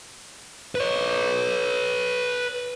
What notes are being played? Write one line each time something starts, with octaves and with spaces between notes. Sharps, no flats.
B4 C#5